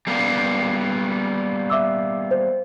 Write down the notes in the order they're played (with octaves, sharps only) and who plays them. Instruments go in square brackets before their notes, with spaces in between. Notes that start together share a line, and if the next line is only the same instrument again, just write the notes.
[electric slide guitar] G3 A#3 B3
[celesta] E5 D6 E6
C5